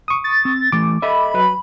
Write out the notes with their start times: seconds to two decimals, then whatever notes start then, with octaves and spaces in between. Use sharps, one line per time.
0.08 C#6 D#6
0.24 A6
0.45 C4
0.72 E3 A3 D6
1.02 A4 D#5 E5 B5
1.34 F#3 B4